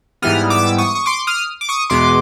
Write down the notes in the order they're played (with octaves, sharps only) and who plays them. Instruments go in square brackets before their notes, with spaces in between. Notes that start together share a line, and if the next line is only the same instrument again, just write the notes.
[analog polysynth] G#2 E3 G3 B3 D#6 F6
D6 E6
C#6 D#6
C#6
C6 D6
D#6 F6
D6
C#6 D#6
E2 B2 G#3 B3 C6 D6